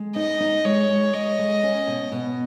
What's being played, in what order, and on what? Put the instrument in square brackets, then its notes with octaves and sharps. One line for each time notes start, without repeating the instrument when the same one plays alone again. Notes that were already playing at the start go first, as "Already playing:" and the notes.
Already playing: [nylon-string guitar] G#3
[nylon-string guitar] D#4 [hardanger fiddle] D#5
[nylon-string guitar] D#4
[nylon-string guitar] G#3 [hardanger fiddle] C#5
[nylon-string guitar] G#3
[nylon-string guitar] G#3 [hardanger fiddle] D#5
[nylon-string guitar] G#3
C#4
B2
B2